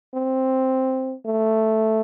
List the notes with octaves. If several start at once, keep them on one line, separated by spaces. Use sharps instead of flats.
C4
A3